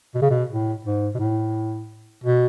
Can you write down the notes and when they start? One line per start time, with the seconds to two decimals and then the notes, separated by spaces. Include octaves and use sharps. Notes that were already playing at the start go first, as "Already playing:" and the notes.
0.15 B2
0.22 C#3
0.30 B2
0.49 A2
0.85 G#2
1.15 B2
1.19 A2
2.24 B2